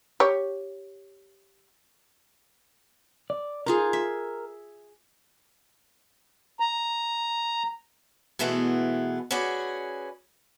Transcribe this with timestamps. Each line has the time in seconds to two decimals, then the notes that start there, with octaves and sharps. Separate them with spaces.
0.20 G4 C#5
3.30 D5
3.66 D#4 F4 G#4 A#4
3.93 E5
6.60 A#5
8.39 B2 E3 G#3 A3 B3
9.31 C#4 F#4 G#4 B4 D5